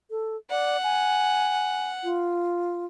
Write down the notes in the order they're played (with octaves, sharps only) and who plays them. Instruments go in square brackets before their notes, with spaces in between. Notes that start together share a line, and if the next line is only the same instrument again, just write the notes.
[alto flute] A4
[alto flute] D5 [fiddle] F#5
[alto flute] G#5
F4